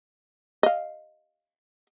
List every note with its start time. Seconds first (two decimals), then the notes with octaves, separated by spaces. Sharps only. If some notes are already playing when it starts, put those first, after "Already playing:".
0.63 D#5 F5